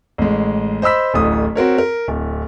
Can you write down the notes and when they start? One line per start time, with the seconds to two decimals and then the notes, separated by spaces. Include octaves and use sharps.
0.18 A1 G#3
0.82 C5 D#5 B5 E6 B6
1.14 D1 A1 D#6
1.56 C4 F#4 A#4 C#5
1.78 A#4
2.08 D1